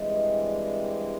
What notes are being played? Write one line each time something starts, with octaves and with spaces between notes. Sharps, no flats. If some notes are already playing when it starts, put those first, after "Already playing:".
Already playing: G2 E3 G#3 C4 D#5
D5